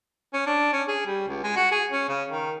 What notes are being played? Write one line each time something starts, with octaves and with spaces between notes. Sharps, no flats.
C#4
D4
C#4
G#4
G3
C#2
G#3
F#4
G#4
C#4
C#3
D#3